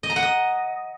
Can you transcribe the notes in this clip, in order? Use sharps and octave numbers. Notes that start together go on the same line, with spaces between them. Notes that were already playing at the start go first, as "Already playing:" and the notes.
D#5
A#5
F#5
D#5